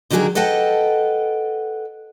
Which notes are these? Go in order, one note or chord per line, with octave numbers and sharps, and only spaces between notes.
D3 D#3 F#3 G3 G#4 A#4
A4 B4 D#5 F#5 G5 A5